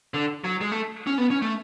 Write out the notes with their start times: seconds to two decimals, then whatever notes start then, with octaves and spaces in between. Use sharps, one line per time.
0.14 D3
0.44 F#3
0.61 G#3
0.72 A3
1.07 C#4
1.18 B3
1.30 C#4
1.42 A3